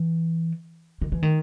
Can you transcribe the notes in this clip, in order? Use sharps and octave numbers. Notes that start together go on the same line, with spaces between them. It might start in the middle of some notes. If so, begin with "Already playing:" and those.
Already playing: E3
D#3
E3
D#3